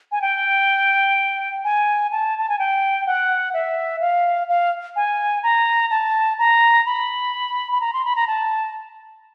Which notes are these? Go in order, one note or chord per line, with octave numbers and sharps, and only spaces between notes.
G#5
G5
G#5
A5
A5
G#5
G5
F#5
E5
F5
F5
G#5
A#5
A5
A#5
B5
B5
A#5
C6
B5
A#5
A5